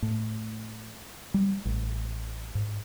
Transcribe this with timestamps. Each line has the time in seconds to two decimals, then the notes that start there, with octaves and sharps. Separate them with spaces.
0.02 A2
1.34 G3
1.65 A1
2.55 G#2